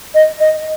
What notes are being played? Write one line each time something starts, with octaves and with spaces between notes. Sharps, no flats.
D#5
D#5